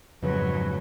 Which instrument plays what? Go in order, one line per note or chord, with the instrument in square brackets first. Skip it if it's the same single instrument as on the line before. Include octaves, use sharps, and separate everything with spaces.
[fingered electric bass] F2 C#3 [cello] G#2 F#3 [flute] B4